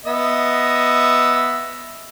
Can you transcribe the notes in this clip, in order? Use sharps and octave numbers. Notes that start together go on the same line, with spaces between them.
B3 D#5 E5